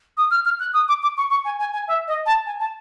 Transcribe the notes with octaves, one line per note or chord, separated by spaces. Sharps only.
D#6
F6
F6
F#6
D#6
D6
D6
C#6
C#6
G#5
G#5
G#5
E5
D#5
A5
G#5
A5